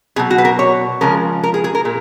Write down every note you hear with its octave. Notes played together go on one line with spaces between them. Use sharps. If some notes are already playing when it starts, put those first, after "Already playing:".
B2 F#3 G#4
F#4
B4
A#4
C#5
C#3 F3 G#3 A#4
A#4
G#4
G#4
A#4
A#2